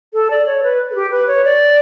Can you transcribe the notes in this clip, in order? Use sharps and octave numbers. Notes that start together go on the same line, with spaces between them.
A4
D5
C#5
B4
A4
G4
B4
C#5
D5